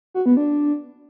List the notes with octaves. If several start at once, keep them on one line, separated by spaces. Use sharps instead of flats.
F#4
B3
D4